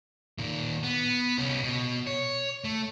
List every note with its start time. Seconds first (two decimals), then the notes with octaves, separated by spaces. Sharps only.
0.38 A#2 D#3
0.83 B3
1.38 C2 C#4
1.63 B2
2.07 C#5
2.64 A3